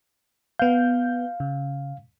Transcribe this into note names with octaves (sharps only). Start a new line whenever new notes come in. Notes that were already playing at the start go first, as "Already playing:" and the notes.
B3 F5 G6
C#3